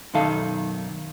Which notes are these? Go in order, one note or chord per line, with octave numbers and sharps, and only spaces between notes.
B1 F#2 D#3 A4 F5